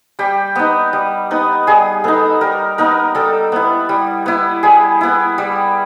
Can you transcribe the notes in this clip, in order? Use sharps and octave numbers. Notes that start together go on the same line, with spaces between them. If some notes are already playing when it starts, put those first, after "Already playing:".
G3 G4
B3 D#4
G3
B3 D#4
G3 G#4
B3 D#4 A4
G3 A#4
B3 D#4 A#4
G3 A4
B3 E4
G3
B3 E4
G3 G#4
B3 E4
G3